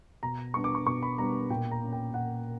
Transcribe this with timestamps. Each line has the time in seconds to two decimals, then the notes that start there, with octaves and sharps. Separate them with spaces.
0.23 B2 A#5
0.54 G3 B3 D4 C#6
0.64 D6
0.75 C#6
0.87 B2 C#6
1.03 B5
1.18 G3 B3 D4 A#5
1.50 A#2 G5
1.71 A#5
1.82 A#3 C#4
1.93 G5
2.13 A#2 F#5